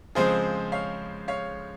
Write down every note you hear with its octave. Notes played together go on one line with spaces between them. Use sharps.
C#3 F3 G#3 C4 G#4 C5
C#5 F5
C#5 F5